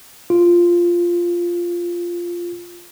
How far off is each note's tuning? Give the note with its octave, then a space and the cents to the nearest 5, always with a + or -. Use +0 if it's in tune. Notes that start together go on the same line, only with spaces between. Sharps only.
F4 -5